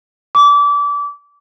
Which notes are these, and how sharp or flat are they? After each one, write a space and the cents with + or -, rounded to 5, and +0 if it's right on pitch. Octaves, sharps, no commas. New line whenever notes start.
D6 -25